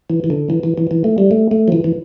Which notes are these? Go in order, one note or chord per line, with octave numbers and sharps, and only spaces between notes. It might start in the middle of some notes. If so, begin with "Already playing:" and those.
E3
E3
D3
E3
E3
E3
E3
A3
G3
A3
A3
F3
E3
E3